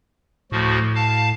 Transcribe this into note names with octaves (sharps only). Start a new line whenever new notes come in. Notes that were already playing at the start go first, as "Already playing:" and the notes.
D2 A2 F3 F#4
F5 A5